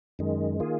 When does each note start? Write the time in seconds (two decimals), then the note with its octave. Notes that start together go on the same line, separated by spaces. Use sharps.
0.19 F#2 D#3 G#3
0.60 D#3 A#3 F4 G#4